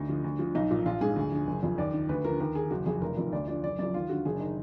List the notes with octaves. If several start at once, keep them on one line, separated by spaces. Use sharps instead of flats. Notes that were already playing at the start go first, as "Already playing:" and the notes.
Already playing: D2 D#4
D3 F3
D2
D3 F3
B1 D#4
A#2 F3
A#1 F4
G#2 F3 G#4
D2
D3 F3
F#1
F2 F3
D#2 D5
D#3
D2 B4
D3 F3 A#4
D#2 A#4
D#3 G#4
F#1 F#4
F2 F3 G#4
F1 A#4
F2 D#3
D2 D5
D3 F3 D5
F#1 D5
F#2 F3 D5
D#2 F4
D3 F3 F#4
F#1 G#4
D4
D#3 D#4